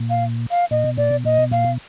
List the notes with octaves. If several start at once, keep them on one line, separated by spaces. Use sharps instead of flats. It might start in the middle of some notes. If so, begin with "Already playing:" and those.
Already playing: A#2
F5
F5
A#2 D#5
B2
A#2 D5
B2
A#2 D#5
B2
A#2 F5
B2